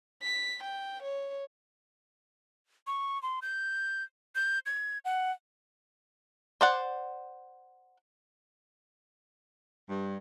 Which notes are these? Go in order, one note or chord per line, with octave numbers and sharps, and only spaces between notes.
B6
G5
C#5
C#6
C6
G6
G6
G#6
F#5
C5 D5 F#5
G2